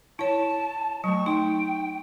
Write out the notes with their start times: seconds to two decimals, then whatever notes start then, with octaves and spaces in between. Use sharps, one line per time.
0.19 E4 C#5 A5
1.04 F#3 A3 C#6
1.26 D#4 G5